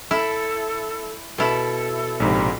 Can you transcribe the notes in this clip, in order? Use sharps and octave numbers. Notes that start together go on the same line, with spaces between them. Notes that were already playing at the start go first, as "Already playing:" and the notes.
E4 A4
B2 E4 A4
A#1 G#2 C3